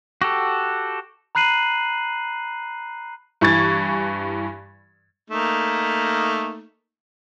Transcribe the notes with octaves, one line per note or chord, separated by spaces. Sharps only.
F#4 G4 A4
A#5 B5 F#6 C7 D#7 F#7
G2 E3 C#6 G#6 A6
A3 A#3 D#4